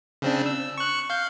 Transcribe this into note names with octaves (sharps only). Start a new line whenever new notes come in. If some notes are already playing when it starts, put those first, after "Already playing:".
C#3 C4 D4
E6
C#6 F#6
F5 G6